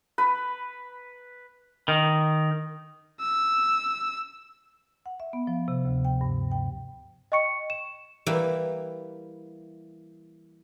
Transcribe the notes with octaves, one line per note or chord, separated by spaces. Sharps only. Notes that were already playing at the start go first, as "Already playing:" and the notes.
B4
D#3
E6
F#5
E5
B3
F3
C3
D2
G5
G2
G5
D#5 G5 C#6 C#7
E7
E3 G3 A#3 E4